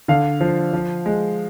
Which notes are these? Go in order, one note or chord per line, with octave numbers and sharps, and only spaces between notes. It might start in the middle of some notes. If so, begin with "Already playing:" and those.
D3 F5
F3
F3
G#3